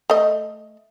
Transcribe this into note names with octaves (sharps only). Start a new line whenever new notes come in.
A3 D#5